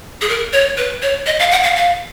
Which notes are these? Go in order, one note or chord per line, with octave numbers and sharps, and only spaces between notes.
G#4
A#4
C#5
B4
C#5
D#5
F5
F#5
F5
F5